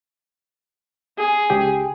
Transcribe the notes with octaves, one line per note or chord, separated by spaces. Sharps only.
G#4
C#2 G4 G5